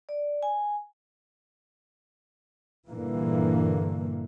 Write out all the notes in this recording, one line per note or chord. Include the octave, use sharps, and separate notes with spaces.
D5
G#5
G2 A#2 D3 E3 A#3